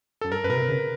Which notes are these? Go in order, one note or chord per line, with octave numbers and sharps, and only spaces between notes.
F#2 A4
G2 A#4
F#2 B4
B2 A#4
C3
C#3